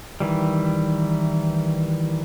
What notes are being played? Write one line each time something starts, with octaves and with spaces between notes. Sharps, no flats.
D#3 E3 G3